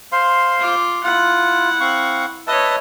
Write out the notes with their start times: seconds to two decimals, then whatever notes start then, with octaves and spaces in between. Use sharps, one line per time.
0.12 C5 F5 C6
0.59 F4 D6
1.03 E4 F4 F#5
1.81 C4 F5 C#6
2.47 B4 C#5 D#5 E5 A5